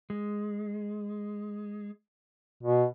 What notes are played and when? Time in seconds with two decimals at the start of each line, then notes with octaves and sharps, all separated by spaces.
0.10 G#3
2.63 B2